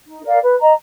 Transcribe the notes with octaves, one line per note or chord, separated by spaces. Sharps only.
D#4
A#4 D5 F5
B4
D#5 A#5